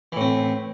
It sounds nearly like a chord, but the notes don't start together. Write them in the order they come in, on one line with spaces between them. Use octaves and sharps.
E3 A2 C4